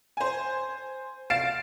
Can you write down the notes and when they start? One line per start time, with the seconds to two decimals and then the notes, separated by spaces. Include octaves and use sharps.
0.17 C5 G#5
1.30 F5 A6 C7 D7 E7